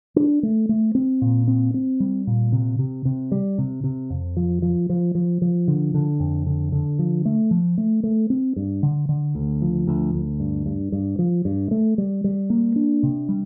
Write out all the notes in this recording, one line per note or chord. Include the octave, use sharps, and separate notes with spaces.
D4
A3
A3
C4
A#2
C4
C4
G3
A#2
C3
C3
C3
G3
C3
C3
F2
F3
F3
F3
F3
F3
D3
D3
F2
D3
D3
F3
A3
F3
A3
A3
C4
G2
D3
D3
D2
F3
D2
D2
G2
G2
G2
F3
G2
A3
G3
G3
A#3
D4
C3
G3